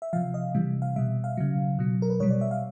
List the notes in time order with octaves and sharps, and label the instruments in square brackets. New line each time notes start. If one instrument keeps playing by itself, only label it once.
[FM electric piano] E5
C3 F3 F5
D#5
C3 E3 G3
F5
B2 G3 E5
F5
C#3 F#3
B2 F#3
A#4
B4
B2 G3 C#5
D5
E5
F5